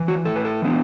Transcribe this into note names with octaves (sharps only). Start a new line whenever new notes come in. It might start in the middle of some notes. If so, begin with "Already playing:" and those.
Already playing: E3
F#4
A2 A4
B4
A4
E3 B3 D4